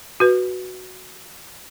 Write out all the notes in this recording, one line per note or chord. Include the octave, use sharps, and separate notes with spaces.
F#4 B4